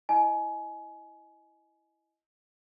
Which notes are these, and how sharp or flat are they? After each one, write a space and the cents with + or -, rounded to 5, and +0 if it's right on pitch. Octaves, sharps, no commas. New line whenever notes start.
E4 +0 D#5 +5 G#5 +25